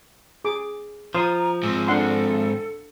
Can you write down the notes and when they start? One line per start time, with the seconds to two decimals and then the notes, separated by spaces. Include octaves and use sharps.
0.45 G#4 D6
1.15 F3 A#5 C6 D#6
1.63 G#2 C4 E6
1.88 D4 A4 F#5 C6